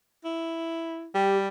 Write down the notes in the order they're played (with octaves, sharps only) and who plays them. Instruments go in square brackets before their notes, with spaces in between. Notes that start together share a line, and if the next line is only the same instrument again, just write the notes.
[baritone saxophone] E4
[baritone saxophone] G3 [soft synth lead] G4